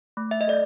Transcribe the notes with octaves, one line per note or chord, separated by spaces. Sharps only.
A3
E5
D#5
A4 D5